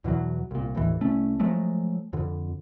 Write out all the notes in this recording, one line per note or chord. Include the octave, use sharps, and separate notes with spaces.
E2 B2 E3 F#3
C2 A#2
G1 D#2 A2 E3
C2 A3 C#4
F3 F#3 G#3 A3
F2 D3